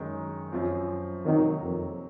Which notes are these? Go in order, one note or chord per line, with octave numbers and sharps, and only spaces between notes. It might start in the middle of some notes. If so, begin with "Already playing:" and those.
Already playing: F#2 D#3 G#3 D#4
F#2 F3 C4
C3 D#3 F#3 A#3
F2